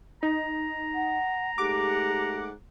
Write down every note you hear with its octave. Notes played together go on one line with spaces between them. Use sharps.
D#4 A#5
F#5
G#2 A3 G4 F#5 D6